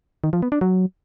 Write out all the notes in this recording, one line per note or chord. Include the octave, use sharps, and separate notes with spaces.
D#3
F3
B3
D4
F#3